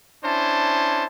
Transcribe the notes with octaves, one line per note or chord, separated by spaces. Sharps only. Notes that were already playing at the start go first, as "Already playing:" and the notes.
C#4 D4 E4 C5 A5